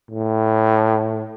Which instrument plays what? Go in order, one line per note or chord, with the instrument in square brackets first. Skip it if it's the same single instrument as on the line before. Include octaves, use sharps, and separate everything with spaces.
[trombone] A2